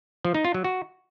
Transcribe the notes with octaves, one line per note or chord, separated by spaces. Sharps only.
F3
D#4
F4
F#3
F#4